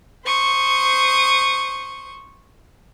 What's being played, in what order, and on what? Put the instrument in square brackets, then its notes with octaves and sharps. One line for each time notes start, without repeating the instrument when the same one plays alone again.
[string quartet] C5 C#6 D#6